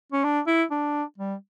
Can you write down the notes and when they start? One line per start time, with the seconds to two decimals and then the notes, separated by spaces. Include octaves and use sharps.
0.12 C#4
0.24 D4
0.47 E4
0.71 D4
1.18 G3